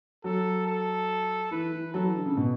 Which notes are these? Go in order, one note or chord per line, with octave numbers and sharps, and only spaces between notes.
F#3 A4
A4
E3 B4
E3
F#3 A4
E3
D3
C#3
B2